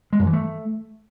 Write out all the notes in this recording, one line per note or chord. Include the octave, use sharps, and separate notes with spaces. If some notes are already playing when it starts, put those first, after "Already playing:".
G#3
F#2
E3
A3